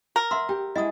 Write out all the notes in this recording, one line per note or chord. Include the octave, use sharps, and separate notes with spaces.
A#4
E5 F#5 C6 E6
G4 G5
G#3 E4 D#5 F#5 D#6